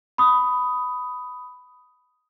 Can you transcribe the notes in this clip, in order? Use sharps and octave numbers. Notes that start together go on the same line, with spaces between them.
B5 D#6